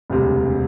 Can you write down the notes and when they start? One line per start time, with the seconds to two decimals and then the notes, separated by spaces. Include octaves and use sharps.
0.10 E1 D2 C3 G3